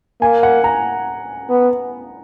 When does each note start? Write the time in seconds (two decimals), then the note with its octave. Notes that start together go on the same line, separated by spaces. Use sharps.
0.21 A#3 G#5
0.43 F#5
0.64 A#5
1.49 B3